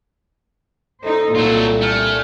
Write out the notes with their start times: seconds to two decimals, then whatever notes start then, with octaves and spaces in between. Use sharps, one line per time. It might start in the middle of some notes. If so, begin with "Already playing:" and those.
1.04 D#4 A4 C5
1.35 C2 A#2 F#3 A3 F4
1.82 A3 D4 G#5 F6